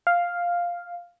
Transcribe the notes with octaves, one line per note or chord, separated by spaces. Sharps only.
F5